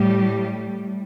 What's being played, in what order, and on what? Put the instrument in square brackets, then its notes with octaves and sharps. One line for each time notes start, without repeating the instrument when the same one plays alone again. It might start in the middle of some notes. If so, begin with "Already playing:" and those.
Already playing: [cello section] A2 G3 G4